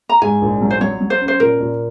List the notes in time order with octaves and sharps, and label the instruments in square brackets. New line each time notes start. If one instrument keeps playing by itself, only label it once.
[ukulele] A#5
[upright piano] G#2 [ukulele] G#5
[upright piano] A#1
F#3
[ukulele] C5
[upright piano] F#3 [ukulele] C#5
[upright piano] F#3
[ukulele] C5
[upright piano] C#4
[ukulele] C5
[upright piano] A#2 [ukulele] A#4
[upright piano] A#2